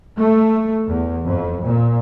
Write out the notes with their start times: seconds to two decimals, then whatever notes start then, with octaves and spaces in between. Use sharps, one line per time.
0.18 A3
0.87 E2
1.28 F2
1.64 A#2